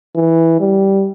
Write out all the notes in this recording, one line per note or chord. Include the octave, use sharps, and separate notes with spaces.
E3
G3